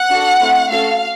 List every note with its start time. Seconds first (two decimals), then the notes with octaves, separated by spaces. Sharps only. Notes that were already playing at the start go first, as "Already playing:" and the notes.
Already playing: F#5
0.09 D4 F#4 A4
0.39 A3 C4 E4
0.70 A3 C#4 F#4 A4 F5